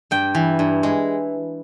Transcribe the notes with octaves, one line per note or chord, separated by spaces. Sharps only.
G2 G5
E3
G2
G#3